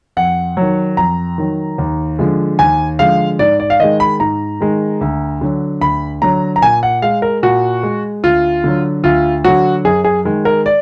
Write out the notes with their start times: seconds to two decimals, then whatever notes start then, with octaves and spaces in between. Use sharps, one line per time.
0.17 F2 F#5
0.57 D#3 F#3
0.97 F2 A#5
1.38 D#3 F#3
1.78 D#2
2.19 D3 F3 G#3
2.59 D#2 G#5
2.99 D3 F3 G#3 F5
3.39 G#2 D5
3.60 D5
3.70 F5
3.80 D#3 G#3 D#5
4.00 B5
4.20 G#2 A#5
4.61 D#3 G#3
5.01 D2
5.41 D3 F#3
5.81 D2 B5
6.22 D3 F#3 A#5
6.56 A#5
6.62 A#2 G#5
6.83 F#5
7.02 G#3 F5
7.22 A#4
7.43 A#2 F#4
7.83 G#3
8.23 D2 F4
8.64 D3 F#3
9.04 D2 F4
9.44 D3 F#3 F#4
9.85 F#2 G#4
10.04 G#4
10.25 D#3 G#3
10.45 A#4
10.66 D5